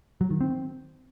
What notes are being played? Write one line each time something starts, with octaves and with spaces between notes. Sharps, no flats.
F#3
D#3
C4